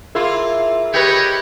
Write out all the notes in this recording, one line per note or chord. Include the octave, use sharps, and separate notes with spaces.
E4 F4 G#4 A#4 E5
E4 G4 B4 C#5 D#5